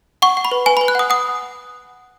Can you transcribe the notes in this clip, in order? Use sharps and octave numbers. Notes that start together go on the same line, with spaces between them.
F#5 C#6
F#5
B5
B4
B4 G#5
B5
B4
F#6
F#5 D#6
F#5 D#6